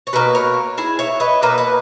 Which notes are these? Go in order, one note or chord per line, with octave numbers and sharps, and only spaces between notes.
C#5
B2 A#3 B4 D#5
A#4 C#5
E4 G#4
C#5 E5
B4 D#5
B2 A#3 B4 D#5
B4 D#5